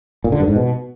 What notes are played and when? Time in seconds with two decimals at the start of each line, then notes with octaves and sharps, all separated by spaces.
0.24 A#2
0.32 D3
0.40 G2
0.48 G#2
0.56 B2